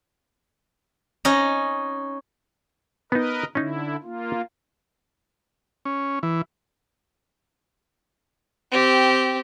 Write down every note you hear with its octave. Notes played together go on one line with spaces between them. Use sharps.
C#4 D#4 D#5
B3 D#4 A#4 B4 D#5
D3 C#4 D#4 E4
A#3 F4
C#4
E3
C4 G4